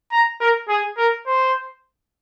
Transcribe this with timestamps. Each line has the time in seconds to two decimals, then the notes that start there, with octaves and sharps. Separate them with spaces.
0.12 A#5
0.40 A#4
0.69 G#4
0.97 A#4
1.26 C5